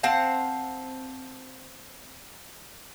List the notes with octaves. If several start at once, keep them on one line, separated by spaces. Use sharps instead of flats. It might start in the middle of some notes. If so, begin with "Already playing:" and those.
C4 F5 F#5 A5